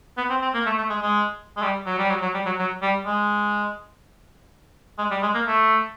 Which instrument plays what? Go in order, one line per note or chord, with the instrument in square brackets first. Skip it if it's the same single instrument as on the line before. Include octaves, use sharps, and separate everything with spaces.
[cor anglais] B3
C4
C4
A#3
A3
A3
G#3
G#3
G#3
G3
F#3
G3
F#3
F#3
G3
F#3
F#3
G3
G#3
G#3
G3
G#3
A#3
A3